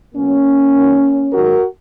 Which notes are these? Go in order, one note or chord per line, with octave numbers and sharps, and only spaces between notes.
B2 F#3 A#3 C#4
F#2 D#3 F#3
G#2 D#3 F#3 F#4 A#4